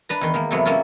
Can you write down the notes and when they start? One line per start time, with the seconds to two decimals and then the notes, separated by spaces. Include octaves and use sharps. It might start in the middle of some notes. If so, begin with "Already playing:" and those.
0.09 D4 B4 A#5
0.21 E2 D#3 C6
0.34 D#3 G#3 A#3
0.51 E2 C3 F#3 A3 B3
0.65 G#3 A#3 C4 C#4 E4 F4